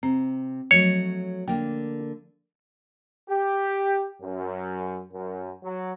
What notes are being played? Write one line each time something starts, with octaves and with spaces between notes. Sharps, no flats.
C3 C4
F3 F#3 A3 C#5
D3 A#3 G5
G4
F#2
F#2
F#3